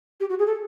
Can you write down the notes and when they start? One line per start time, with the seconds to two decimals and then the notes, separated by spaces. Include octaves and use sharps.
0.20 G4
0.29 F#4
0.38 G#4
0.46 A4